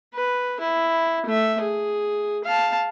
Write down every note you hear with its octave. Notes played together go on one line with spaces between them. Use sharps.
B4
E4
A3 E5
G#4
F5 A5